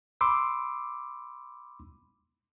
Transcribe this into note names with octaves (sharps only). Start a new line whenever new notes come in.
B5 C6 D6 E6